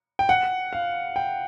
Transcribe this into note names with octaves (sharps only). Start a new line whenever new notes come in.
G5
F#5
F5
G5